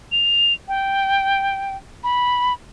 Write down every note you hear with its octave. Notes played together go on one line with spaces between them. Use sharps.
F7
G5
B5